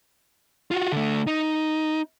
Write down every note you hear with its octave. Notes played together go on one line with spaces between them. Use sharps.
F4 F#4
D3 A3
D#4